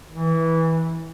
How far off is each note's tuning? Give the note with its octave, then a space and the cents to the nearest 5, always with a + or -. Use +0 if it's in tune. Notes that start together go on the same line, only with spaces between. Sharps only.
E3 -15